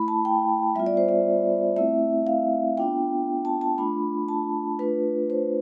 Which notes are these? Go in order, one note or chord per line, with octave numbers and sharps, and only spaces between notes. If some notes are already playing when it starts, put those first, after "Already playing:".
Already playing: A3 E4 B5
A5
G5
G3 B3 F4 E5
D5
C5
D5
A3 C4 E4 E5
F5
B3 D4 F4 G5
A5
A5
A3 D4 F4 B5
A5
A3 D4 F4 B4
C5